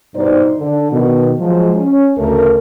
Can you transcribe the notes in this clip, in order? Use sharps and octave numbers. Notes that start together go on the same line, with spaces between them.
G2 B2 D#4 C5 D5
D3
B2 D#3
F3 F#3 G#3
C#4
D2 C#3 A3 A#4